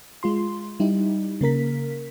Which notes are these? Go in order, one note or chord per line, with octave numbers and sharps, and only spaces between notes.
G#3 F4 C6
G3 D#4 E4 G4
C#3 A#3 A#4 B6